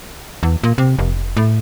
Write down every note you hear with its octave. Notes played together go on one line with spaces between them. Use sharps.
E2
A#2
C3
F1
A2